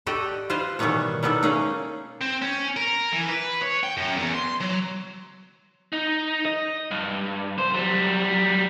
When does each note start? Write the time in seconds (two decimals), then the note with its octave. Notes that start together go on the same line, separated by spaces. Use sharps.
0.06 F#4 G4 A4 D5 D#5 G5
0.50 F4 B4 C5 D#5 F5
0.79 B2 D#3 E3 G3 B3 C#5
1.23 G3 B3 D#4 E4 A4
1.43 A#3 C#4 D#4 G#4 A#4 F5
2.21 C4
2.42 C#4
2.76 A#4
3.13 E3
3.29 B4
3.62 C#5
3.83 G5
3.97 F#2
4.17 E2
4.34 C6
4.61 F#3
5.93 D#4
6.45 D#5
6.91 G2
7.58 C2 C5
7.74 F#3 G3